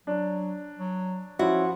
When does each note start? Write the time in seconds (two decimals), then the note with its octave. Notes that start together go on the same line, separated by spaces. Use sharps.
0.07 F#3 D4
0.79 F#3
1.39 F3 C#4 E4 F#4